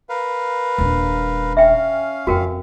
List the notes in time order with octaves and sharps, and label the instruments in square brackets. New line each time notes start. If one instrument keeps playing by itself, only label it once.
[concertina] A#4 B4 F5
[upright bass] D#1 D4
[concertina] C#4 F5 [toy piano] E5 G5
[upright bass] F2 C4 [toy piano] F#4 A#4 G5